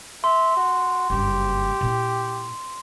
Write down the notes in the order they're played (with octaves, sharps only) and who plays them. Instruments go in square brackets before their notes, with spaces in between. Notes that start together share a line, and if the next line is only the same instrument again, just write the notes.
[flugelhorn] E5 [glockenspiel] C6
[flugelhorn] F#4
[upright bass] F#1 G2 [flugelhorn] G4
[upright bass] A#2 E4